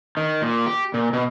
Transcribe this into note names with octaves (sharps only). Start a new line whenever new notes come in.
D#3
A#2
G4
A#2
B2